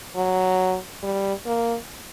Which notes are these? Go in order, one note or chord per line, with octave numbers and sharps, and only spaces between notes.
F#3
G3
A#3